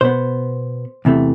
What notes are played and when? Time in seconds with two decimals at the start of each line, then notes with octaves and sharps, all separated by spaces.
0.01 B2 B3 C5
1.05 E2 C3 E3 A3